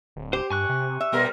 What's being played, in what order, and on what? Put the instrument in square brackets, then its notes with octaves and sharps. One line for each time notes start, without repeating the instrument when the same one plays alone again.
[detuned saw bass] D1
[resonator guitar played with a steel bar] G4 [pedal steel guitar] C5
[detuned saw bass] G2 [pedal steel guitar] G#5 C#6 F#6
[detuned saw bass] C3
[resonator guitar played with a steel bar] E5
[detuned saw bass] B2 [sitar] G3 B3 A#4